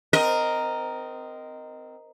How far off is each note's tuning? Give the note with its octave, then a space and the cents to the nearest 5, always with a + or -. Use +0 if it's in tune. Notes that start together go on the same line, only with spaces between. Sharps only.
C4 -20 A#4 +0 D#5 +0